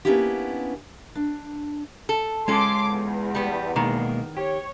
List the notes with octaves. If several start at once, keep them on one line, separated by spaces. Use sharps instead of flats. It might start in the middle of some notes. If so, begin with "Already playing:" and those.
A#3 B3 C#4 D4 E4 G4
D4
A4
G#3 C#4 F4 G#4 A4 C6 D6
E2
G3 B3
B2 D#3 G#3 A#3
G4 C#5